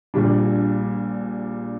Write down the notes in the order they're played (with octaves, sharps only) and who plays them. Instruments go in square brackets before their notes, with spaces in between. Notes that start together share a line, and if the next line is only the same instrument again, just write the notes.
[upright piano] A#1 A#2 G3 D4